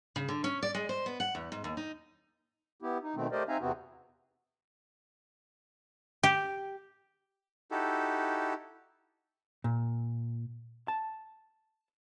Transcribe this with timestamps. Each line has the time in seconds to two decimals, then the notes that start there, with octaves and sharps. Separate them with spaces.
0.16 C#3
0.29 D3
0.44 C#4
0.63 D5
0.75 G#3
0.89 C5
1.06 B3
1.20 F#5
1.35 E2
1.52 G#2
1.64 D#2
1.77 D#4
2.82 B3 E4 G4
3.03 D#4
3.16 B2 D#3 A3 C4
3.32 A3 G4 A#4 C5 D5 D#5
3.48 C4 D#4 E5 F5 G#5 A#5
3.61 E2 C3 B3 C4 F#4
6.23 G4
7.71 D#4 E4 F#4 G4 A4
9.64 A#2
10.88 A5